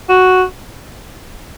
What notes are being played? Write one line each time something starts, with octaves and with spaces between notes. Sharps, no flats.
F#4